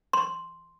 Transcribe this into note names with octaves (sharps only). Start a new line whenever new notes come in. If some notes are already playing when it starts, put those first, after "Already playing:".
C6